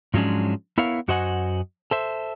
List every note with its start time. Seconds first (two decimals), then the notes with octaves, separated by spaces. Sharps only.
0.14 G#2 F3 F#3 G#3 C#4 D4
0.78 B3 E4 A#4 C#5 F5
1.08 F#2 F#4 C5 D#5 F#5 G#5
1.91 A4 C5 E5